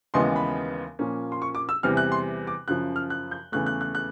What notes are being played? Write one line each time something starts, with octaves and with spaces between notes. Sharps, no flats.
D#2 C#3 E3 G#3 B3 C6
B5
A#2 F3 A#3 C#4
C6
C#6
D6
E6
E2 C3 E3 G3 F6
F#6
C6
D6
F#2 C#3 F3 F#6
F6
F#6
G6
E2 C#3 E3 A3 F#6
F#6
F#6
F#6